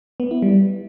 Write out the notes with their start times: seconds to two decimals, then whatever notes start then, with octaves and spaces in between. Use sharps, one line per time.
0.20 B3
0.31 E4
0.42 G3